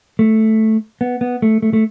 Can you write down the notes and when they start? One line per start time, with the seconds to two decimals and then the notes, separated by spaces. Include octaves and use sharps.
0.19 A3
1.01 B3
1.21 B3
1.42 A3
1.62 A3
1.73 A3